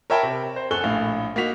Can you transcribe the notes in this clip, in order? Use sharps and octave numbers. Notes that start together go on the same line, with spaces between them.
A#4 C#5 E5 G5 A5 B5
C3
C5
F#1 A4 G#5 C#6 F#6 G7
A#1 A2 F5
A#3 D#4 F#4 B6 F7